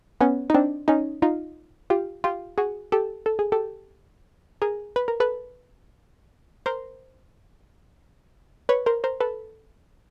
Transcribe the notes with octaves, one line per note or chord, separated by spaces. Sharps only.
B3 C#4
D#4
C4 D4
C#4 D#4
D#4 F4
F4 G4
F4 G4
F#4 G#4
G4 A4
A4
G#4
G4 A4
G#4 A#4
B4
A#4
A4 B4
A#4 C5
B4 C#5
A#4 C5
A#4 C5
A4 B4